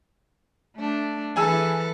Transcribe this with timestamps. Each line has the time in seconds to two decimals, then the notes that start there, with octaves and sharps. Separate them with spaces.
0.76 A3 D4
1.36 E3 G#4 A4 B4 G#5 E6